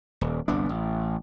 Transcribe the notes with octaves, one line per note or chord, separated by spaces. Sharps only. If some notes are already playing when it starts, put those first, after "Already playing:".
D#1
G1 C2 B3 D4
A1